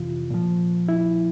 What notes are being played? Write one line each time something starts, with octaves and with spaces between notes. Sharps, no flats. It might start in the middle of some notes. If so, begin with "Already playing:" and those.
Already playing: F2 C3 E3 F4
A#2 F3
E4